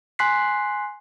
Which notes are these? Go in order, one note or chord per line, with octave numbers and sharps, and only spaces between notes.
G#5 C6 F#6 B6 C7